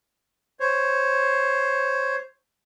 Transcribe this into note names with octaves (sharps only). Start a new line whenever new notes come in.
C5 C#5